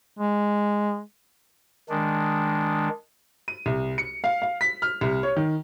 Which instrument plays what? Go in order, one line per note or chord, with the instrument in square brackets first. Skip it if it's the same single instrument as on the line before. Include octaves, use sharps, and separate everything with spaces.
[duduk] G#3
[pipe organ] D#3 G#3 D4
[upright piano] D#7
C2
C#7
F5
F5
B6
F6
C2
C#5
D#3